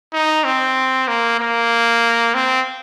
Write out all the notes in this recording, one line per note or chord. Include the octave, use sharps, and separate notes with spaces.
D#4
C4
A#3
A#3
C4